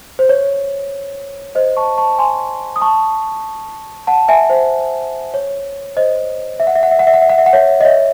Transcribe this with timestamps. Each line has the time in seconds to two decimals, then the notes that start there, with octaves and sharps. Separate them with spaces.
0.19 C5
0.29 C#5
1.55 C5 D#5
1.77 A5 C#6
1.98 A5 C#6
2.19 G#5 C6
2.76 D#6
2.82 A5 C#6
4.07 F#5 A5
4.28 E5 G#5
4.50 C5
5.34 C#5
5.97 C5 D#5
6.60 E5
6.67 F#5
6.76 E5
6.83 F#5
6.91 E5
6.99 F#5
7.07 E5
7.14 F#5
7.22 E5
7.29 F#5
7.38 E5
7.46 F#5
7.53 C#5 E5
7.81 D#5
7.85 C#5 E5